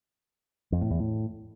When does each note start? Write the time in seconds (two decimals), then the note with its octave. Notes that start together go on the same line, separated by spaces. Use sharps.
0.72 F2
0.81 A2
0.91 E2
1.00 A2